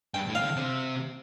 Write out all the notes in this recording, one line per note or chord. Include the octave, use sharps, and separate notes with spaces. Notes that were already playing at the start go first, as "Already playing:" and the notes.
G2 G5
A2
F5
D3
C3